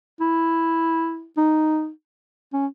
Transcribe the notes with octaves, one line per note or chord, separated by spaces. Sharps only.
E4
D#4
C#4